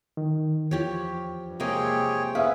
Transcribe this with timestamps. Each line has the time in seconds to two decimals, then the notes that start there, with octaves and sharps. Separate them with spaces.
0.17 D#3
0.71 E2 F3 G4 C#5
1.46 G2
1.60 C3 G#3 A#3 G#4 C#5 G5
2.35 B3 C#4 G#4 B4 E5 F5